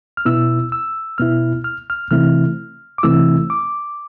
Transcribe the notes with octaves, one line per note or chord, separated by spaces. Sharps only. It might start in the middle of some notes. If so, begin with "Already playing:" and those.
F6
B2 B3 E4 E6
E6
B2 B3 E4 F6
F6
F6
C3 E3 A3 C4 E4 F6
D6
C3 E3 A3 C4 E4 E6
D6